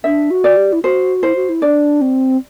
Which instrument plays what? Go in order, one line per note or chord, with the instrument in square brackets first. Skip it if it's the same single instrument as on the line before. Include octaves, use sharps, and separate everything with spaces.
[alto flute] D4 [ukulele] E5
[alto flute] F#4
[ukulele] D5
[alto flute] G4
E4
[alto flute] F#4 [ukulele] C5
[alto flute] E4 [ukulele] C5
[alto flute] F#4
E4
[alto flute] D4 [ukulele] D5
[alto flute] C4